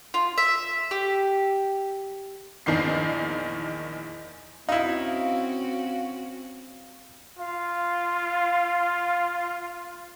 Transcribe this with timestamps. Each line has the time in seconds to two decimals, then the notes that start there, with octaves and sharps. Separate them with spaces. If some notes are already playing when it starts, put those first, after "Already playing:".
0.14 F4
0.38 E5
0.91 G4
2.66 A#1 E2 D#3 D4 D#4 C7
4.69 C4 C#4 D#4 E4 F#4 F5
7.39 F4 F5